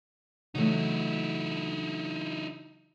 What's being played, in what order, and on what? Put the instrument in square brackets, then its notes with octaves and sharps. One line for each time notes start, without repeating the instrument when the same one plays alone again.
[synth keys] C#3 E3 [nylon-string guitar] F#3 A3 [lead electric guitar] D#4 E4